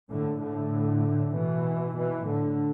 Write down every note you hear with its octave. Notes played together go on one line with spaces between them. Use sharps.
A2 D3
A2 D3
B2 E3
B2 E3
A2 D3